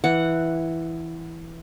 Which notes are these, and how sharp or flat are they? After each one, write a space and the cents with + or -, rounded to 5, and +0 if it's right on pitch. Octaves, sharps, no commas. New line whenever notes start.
E3 +0 F#5 +0